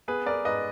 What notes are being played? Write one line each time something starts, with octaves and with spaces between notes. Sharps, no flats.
B3 G#4 B4
A#4 D5
G#2 B4 D#5